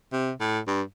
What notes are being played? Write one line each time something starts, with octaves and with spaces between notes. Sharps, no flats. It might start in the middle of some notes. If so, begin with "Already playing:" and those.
C3
A2
G2